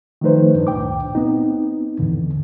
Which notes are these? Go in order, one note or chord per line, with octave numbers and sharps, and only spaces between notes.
D#3 F3 A3 D#4 B4 C5
G2 D4
C#2 A#2 G5 D6
B3 C4 D#4
D#2 G#2 D3 E3